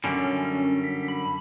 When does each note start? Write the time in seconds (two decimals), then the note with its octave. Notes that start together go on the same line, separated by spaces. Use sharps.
0.04 F#2 D3 G3 C#4
0.84 B6
1.08 B5